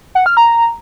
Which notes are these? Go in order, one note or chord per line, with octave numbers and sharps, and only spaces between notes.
F#5
F6
A#5